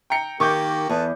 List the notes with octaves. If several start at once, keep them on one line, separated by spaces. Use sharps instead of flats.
G5 A#5 C#7
D#3 A#3 G4 C#6 D6 G6
E2 B3 A4